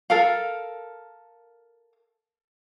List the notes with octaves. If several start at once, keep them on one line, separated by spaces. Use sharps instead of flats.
A4 A#4 F5